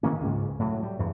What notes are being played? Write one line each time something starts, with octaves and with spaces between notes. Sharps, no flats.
D#3 A#3 C#4
C#2 G#2
A2 F#3
G3
E2 G2